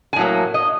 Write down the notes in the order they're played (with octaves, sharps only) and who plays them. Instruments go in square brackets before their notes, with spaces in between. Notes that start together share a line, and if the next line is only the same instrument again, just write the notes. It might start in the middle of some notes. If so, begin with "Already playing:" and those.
[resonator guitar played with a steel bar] G#5
A2 F#3 A#3
D#5